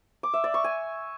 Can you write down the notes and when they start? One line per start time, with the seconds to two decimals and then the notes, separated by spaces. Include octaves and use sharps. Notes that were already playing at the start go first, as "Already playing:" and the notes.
0.23 D6
0.34 E5
0.44 D5
0.54 C#6
0.64 G#5